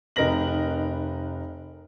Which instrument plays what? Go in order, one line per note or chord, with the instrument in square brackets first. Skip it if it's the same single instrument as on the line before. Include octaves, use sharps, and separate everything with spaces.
[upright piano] F1 D#4 A#4 B4 A#6 F#7